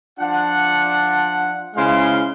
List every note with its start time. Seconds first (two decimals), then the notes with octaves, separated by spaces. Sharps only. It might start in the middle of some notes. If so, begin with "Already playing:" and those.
0.20 F3 D4 F4 F#5
1.75 C#3 G#3 E4 C5 F5 C6